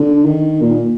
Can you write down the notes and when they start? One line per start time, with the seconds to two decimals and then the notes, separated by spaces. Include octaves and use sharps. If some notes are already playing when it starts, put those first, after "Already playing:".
Already playing: D3
0.25 D#3
0.62 A#2